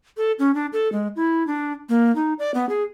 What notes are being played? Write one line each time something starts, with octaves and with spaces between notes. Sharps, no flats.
A4
C#4
D4
A4
G#3
E4
D4
A#3
D#4
D5
B3
G#4